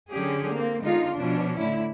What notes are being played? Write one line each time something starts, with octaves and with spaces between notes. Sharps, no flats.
D3 F#3 C#4 G4 G#4
A#3 C4
D3 G#3 B3 D#4 F4
B2 F3 C#4 D4
A2 D3 E4